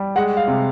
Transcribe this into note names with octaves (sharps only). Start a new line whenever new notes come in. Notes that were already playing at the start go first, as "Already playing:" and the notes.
Already playing: G3
G#3 F#5
F5
C3